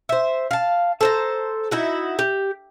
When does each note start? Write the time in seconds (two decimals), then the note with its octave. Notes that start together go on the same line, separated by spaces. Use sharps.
0.09 C5 E5
0.51 F5 A5
1.01 A4 C5 A#5
1.71 D#4 E4 F#4
2.19 G4